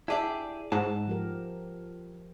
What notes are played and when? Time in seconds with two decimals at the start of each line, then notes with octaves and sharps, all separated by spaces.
0.08 D4 E4 G4 G#4 D5 E5
0.72 G#2 F#5 A5
1.07 F3 G4 A#4